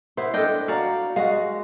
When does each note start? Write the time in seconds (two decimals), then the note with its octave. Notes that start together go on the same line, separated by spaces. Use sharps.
0.17 B3 E4 C5
0.34 D4 A4 D#5 G5
0.68 F#4 D5 F5 A#5
1.16 G#3 F#4 F5